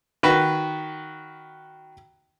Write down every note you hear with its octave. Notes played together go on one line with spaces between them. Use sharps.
D#3 F#4 B4